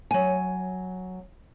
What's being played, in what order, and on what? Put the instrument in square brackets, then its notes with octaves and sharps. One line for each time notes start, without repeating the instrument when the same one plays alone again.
[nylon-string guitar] F#3 G#5